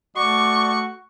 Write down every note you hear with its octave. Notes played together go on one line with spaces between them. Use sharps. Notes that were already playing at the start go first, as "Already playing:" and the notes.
A3 F#4 D5 C#6